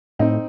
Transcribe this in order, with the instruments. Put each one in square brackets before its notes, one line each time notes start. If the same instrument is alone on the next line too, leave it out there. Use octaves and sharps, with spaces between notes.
[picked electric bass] A2 [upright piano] C4 D#4